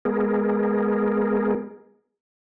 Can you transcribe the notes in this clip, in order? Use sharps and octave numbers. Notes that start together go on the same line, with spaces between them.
G#3 B3 G#4 A#4